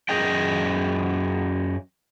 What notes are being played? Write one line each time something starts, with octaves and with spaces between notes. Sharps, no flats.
F#2 G#4 D#5 G5